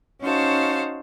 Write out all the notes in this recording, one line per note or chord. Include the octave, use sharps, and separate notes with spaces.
C#4 D#4 F#4 C5 F5 A5